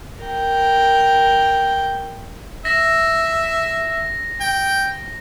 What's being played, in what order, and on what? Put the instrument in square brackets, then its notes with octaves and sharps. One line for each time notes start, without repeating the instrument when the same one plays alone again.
[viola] A#4 G5
[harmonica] E5 [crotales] A#6
[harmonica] G5